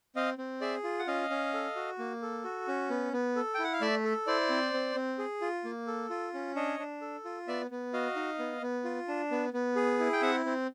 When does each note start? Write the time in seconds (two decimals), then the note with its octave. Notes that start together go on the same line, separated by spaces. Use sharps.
0.16 C4 D#5 F5
0.38 C4
0.61 G#4 D5 E5
0.84 F4
0.99 F#5
1.07 C#4 D#5 F5
1.30 C#4
1.54 A4
1.76 F#4
1.99 A#3
2.22 A4
2.44 F#4
2.68 C#4
2.90 B3
3.13 B3
3.36 A4
3.54 G5
3.59 E4 F#5
3.73 F5
3.81 A3 D5 E5
4.05 A4
4.27 E4 C5 D5
4.50 C4
4.74 C4
4.95 C4
5.18 G#4
5.41 F4
5.64 A#3
5.87 A4
6.10 F4
6.34 C#4
6.56 D4 C#5 D#5
6.80 D4
7.01 A4
7.25 F4
7.48 B3 D5 E5
7.71 B3
7.93 F#4 D#5 F5
8.16 D#4
8.39 B3
8.62 B3
8.84 F4
9.08 D4
9.31 B3
9.53 B3
9.76 G#4
9.99 E4
10.13 G5
10.22 C4 E5 F#5
10.46 C4